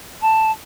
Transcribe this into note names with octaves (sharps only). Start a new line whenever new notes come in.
A5